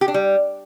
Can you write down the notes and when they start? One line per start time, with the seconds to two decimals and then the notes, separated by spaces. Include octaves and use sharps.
0.01 G4
0.08 D4
0.14 G3